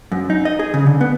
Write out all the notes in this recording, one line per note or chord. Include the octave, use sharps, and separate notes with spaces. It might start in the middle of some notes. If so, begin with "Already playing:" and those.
F#2
D#4
D#5
G#4
C#3
D3
B3